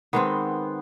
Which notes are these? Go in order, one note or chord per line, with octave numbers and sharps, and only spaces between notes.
D#3 G#3 B3 C4 C6